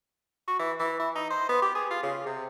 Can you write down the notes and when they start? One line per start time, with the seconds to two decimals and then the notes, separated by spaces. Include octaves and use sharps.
0.48 F#4
0.60 E3
0.80 E3
1.00 E4
1.16 D#4
1.30 C5
1.49 B3
1.62 G4
1.75 G#4
1.91 F4
2.03 C#3
2.26 C3